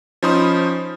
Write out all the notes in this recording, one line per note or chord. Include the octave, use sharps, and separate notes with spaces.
F3 C#4 D#4 C5 B5 D#6